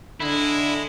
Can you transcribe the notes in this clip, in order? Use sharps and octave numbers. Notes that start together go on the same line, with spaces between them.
D3 G#3 E4